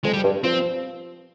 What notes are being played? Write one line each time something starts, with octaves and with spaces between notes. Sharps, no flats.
F2 G#3
G3
G2
F3 C4